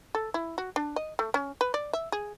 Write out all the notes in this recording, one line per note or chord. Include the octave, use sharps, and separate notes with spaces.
A4
E4
F#4
D4
D#5
A3
C#4
B4
D5
E5
G#4